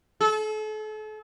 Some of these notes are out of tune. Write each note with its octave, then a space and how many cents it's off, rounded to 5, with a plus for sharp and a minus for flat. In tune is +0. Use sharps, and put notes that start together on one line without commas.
A4 -40